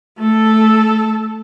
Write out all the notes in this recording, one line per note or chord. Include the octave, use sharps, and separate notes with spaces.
A3 A4